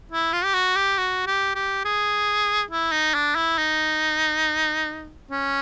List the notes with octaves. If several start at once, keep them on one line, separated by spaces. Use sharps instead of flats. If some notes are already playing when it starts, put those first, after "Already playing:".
E4
F4
G4
F#4
G4
F#4
G4
G4
G#4
E4
D#4
D4
E4
D#4
C#4